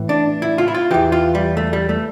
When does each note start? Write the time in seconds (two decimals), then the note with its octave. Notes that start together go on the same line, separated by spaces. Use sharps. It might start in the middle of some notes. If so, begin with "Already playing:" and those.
Already playing: A2 E3
0.09 D4
0.42 E4
0.58 F4
0.68 E4
0.74 F4
0.91 E2 E3 G4
1.12 F4
1.35 G3
1.57 A3
1.73 G3
1.89 A3